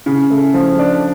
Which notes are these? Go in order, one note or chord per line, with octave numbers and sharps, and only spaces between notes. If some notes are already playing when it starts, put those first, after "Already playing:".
C#3
A3
F3
D4